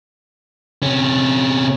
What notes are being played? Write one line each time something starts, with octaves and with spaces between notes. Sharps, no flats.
C3 C#4